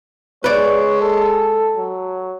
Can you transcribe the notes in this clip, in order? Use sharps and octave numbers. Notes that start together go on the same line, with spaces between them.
G#3 B4 C#5 D5
A4
F#3